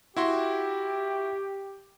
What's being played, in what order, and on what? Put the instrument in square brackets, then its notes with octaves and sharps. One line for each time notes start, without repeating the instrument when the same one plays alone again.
[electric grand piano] E4 F#4 C6 [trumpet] G4